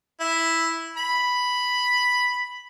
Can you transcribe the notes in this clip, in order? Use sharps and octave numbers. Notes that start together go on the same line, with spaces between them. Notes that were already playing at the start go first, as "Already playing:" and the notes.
E4
B5